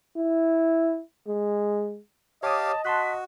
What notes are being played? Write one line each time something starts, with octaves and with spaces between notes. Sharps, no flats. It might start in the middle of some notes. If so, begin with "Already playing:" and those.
E4
G#3
G4 C#5 D#5 F5 A5 D6 D#6
F#4 A5 C6 F#6 B6